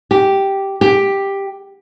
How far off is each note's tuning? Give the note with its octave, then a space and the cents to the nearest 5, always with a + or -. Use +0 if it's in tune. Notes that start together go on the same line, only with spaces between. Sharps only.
G4 -5
G4 +5